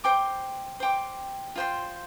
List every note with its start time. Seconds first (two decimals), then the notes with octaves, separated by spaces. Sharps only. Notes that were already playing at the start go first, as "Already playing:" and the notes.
0.04 C5 G5 D6
0.80 C5 G5 D6
1.56 F4 C5 G5 C6